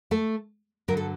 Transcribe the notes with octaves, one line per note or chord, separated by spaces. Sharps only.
A3 A4
G2 D3 F#3 A#4
A4